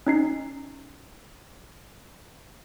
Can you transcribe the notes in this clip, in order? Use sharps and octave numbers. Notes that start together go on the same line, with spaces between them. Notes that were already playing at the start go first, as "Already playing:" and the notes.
C#4 D#4 C7